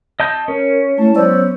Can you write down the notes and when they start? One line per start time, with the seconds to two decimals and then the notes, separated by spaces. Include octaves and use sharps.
0.20 D#5 A5 G6
0.48 C#4 A#4
0.98 G#3 A3 E4 A5
1.16 F#3 B3 C5 D5 E6